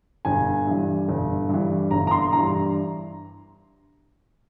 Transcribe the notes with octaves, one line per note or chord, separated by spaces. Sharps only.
G1 G#5
G2 E3
G1
G2 E3
G1 A#5
A#5
C6
G2 E3 A#5